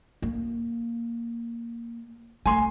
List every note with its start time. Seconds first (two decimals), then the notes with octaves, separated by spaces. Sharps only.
0.22 A#3
2.46 A3 G#5 C6